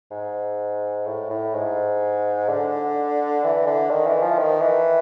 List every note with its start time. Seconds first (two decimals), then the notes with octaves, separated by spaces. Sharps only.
0.11 G#2
1.06 A2
1.30 A2
1.54 G#2
2.49 D3
3.44 E3
3.67 D3
3.91 D#3
4.06 E3
4.23 F3
4.38 D#3
4.62 E3